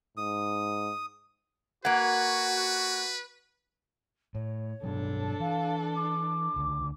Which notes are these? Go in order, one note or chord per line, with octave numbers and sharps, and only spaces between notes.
G#2 D#6
A#3 F#4 B4 F#5 G#6
A2 C#5
G2 B2 F#3 D4 A4
E3 F5
D6
C#2 D3